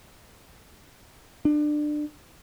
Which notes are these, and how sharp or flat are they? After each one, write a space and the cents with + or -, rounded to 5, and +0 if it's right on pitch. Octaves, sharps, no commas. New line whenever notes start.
D4 +25